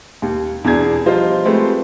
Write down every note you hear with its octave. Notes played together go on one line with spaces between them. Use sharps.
D#2
E2 B2 D4 G#4 G#6
F3 G3 F4 C5 D#5
G#3 A3 C4 G4 B4